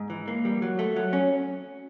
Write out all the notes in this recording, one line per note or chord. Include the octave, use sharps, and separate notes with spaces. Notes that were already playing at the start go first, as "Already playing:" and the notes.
Already playing: G#2
E3
A#3
G3
F#3
A3
F#3
C#4